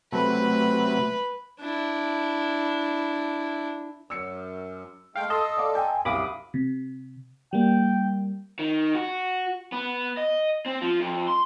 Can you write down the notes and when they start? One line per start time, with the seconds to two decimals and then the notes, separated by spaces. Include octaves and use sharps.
0.12 C3 F#3 A3 B4
1.60 D4 E4
4.10 F#2 E6 C#7
5.16 G#3 A3 F5 G5
5.30 A4 D#5 A5 C6 D#6
5.57 D5 F5 D6
5.75 G5 G#5
6.05 C2 F#2 F5 B5 D6 D#6
6.54 C3
7.53 G3 A#3 G5
8.59 D#3
8.95 F#4
9.72 B3
10.17 D#5
10.66 C4
10.81 F3
11.00 F2
11.28 C6